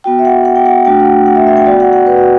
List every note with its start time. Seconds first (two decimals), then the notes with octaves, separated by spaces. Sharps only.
0.04 B3 F#4 G5
0.19 E5
0.25 F#5
0.45 F#5
0.56 G5
0.66 F#5
0.85 A3 D4 F#4 G5
1.00 F#5
1.05 G5
1.26 F#5
1.36 E5
1.47 E5
1.57 G5
1.66 B3 F#4 D5
1.80 F#5
1.93 F#5
2.07 B4
2.18 F#4